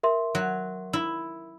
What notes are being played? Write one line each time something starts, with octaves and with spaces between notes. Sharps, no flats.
A#4 E5 C6
F#3
E4